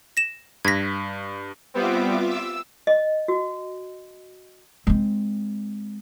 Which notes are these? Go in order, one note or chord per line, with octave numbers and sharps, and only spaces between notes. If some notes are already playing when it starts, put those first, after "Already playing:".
A#6 E7
G2 G#6 A#6 B6
G3 B3 C4 F4 E5 D6
E6
D#5
F#4
G#3 C4